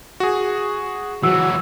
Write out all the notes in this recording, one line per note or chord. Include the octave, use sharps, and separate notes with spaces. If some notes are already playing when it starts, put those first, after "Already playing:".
F#4 G#4
E3 F#3 F#4 E6